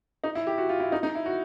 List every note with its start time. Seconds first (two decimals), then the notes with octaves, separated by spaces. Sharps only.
0.24 D#4
0.35 E4
0.47 G4
0.58 F#4
0.69 F4
0.80 E4
0.92 D#4
1.03 D#4
1.15 E4
1.26 F#4